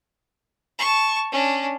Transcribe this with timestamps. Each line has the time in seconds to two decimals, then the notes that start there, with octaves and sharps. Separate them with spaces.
0.79 A5 C#6
1.32 C#4 D4